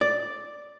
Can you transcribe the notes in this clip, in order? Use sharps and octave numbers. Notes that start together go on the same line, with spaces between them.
D5